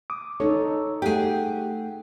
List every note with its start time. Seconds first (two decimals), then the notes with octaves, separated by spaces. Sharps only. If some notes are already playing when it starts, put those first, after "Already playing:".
0.10 D6 D#6
0.40 D#4 A4 C#5
1.02 A3 G4 G#4 F#5 G5